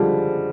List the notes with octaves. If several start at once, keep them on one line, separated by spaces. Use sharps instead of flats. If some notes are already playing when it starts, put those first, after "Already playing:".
Already playing: D3 F3 G3 G#3